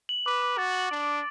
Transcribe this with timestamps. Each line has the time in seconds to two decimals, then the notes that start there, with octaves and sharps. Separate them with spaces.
0.09 F#7
0.26 B4 D6
0.42 D6
0.58 F#4 A6
0.75 F#7
0.91 D4 D7
1.08 D7